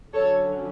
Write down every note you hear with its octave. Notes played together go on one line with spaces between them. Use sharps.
D3 F#3 C#4 A4 C#5